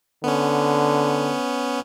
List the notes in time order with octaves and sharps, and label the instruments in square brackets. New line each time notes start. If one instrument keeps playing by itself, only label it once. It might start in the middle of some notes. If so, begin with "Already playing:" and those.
[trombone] D3 [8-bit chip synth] B3 C#4